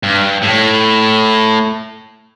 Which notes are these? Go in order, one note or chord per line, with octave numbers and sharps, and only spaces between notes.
G2
A2